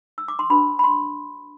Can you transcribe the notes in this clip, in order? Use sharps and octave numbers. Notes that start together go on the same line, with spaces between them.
E6
D6
C6
D4 F#4 B4 B5
B5
C6